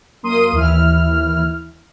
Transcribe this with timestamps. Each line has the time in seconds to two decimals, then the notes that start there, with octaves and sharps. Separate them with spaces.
0.23 F#2 A#3 A#4 C6 D#6 D#7
0.52 D#2 E3 E4 F6